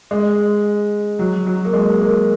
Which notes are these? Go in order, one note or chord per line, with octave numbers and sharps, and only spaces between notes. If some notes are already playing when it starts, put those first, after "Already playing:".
G#3
F#3
F#3
A#3
G#3
A#3